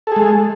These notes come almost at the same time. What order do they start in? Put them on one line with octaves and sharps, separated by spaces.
A4 G#4 G#3